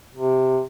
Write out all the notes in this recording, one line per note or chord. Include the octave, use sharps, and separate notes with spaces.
C3